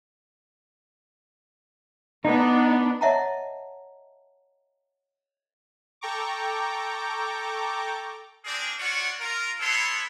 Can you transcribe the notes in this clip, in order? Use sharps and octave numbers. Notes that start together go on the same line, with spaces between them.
B3 D4 D#4
C#5 D#5 E5 F#5 A5 A#5
A4 G5 A#5 C#6 D6
C4 D4 G#4 A#4 D5
F4 F#4 C#5 D5 F#5
F4 A#4
B3 E4 A4 C#5 C6